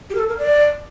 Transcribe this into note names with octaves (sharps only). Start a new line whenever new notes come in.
G4
A#4
A4
A#4
D5